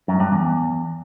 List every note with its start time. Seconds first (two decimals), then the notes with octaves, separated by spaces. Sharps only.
0.08 F#2
0.20 G2
0.32 E2